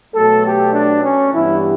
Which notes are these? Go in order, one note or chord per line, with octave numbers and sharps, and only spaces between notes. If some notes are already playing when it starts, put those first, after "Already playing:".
B2 F#3 A3 A4
G4
D4
C#4
G2 E3 G3 B3 E4